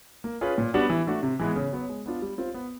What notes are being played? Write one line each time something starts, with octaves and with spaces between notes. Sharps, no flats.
A#3
C#4 F4 G#4 B4
A#2
G3 B3 D4 F#4
E3
A3 D4 F#4
C3
E3 G#3 B3
C#3
F#3 B3
G#3
B3 D4 F4
G3
C4 F4
B3